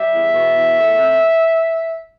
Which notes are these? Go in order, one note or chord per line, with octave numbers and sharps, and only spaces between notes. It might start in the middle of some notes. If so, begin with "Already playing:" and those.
Already playing: G3 E5
E2
B2
E2
A3
C3